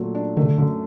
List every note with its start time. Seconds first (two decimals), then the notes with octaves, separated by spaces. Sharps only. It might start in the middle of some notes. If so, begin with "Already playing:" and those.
Already playing: A#2 F#3 A3
0.15 D4
0.37 D#3 A3
0.43 C3
0.47 D3
0.58 F#2 D3